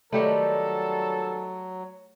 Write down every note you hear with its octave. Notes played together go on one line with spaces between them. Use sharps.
D#3 F#3 G3 A3 B3 G4 A4 C#5